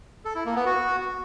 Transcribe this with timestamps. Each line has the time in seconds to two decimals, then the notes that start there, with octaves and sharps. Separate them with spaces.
0.25 A4
0.35 E4
0.45 A#3
0.56 B3
0.66 F#4